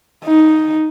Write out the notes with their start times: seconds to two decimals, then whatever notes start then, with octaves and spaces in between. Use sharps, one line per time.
0.24 D#4